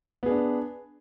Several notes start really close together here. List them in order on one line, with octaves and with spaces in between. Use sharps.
B3 G#4 D4